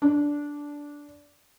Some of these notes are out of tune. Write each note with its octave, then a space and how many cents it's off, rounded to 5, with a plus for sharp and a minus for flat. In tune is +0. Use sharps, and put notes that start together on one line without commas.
D4 -10